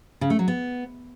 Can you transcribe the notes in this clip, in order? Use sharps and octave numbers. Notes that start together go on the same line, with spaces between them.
C#3
A3
F#3
B3